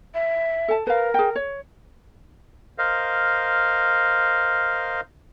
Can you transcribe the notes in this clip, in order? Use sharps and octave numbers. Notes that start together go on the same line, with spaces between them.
E5
A4 A5
A#4 B4 F5
G#4 G5
C#5
A#4 C5 D#5 F5